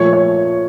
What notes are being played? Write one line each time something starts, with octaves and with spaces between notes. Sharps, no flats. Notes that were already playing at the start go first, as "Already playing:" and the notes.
Already playing: A#2 F3 A3 C#5
C#5